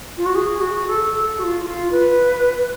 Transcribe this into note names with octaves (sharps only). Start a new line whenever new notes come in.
F4
F#4
G#4
F#4
A4
A4
F#4
F4
F4
B4